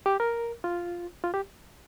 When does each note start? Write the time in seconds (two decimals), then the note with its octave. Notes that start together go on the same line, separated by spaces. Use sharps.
0.06 G4
0.20 A#4
0.64 F4
1.24 F4
1.34 G4